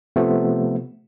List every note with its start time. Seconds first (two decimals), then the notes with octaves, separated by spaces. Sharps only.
0.16 C3 F3 A3 B3